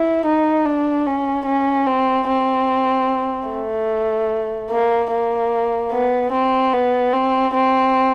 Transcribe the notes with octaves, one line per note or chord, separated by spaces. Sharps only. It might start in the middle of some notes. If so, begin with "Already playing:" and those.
Already playing: E4
D#4
D4
C#4
C#4
C4
C4
A3
A#3
A#3
B3
C4
B3
C4
C4